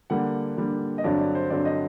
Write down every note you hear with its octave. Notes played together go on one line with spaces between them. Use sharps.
D3 G3 A#3 F#5
D3 G3 A#3
D#5
G2 D3 F#3 C4 D5
D5
C5
G2 D3 F#3 C4 D5
D#5